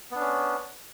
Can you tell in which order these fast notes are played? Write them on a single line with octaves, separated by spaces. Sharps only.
B3 D4 C#4